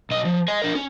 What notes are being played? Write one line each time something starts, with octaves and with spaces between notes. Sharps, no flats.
B1 D#5
F3
D#5 G#5
D4 A#4
C#4